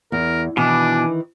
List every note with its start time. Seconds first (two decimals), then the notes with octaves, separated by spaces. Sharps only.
0.12 E2 A#4
0.57 B2 D#3 E3 D4 G#5 D6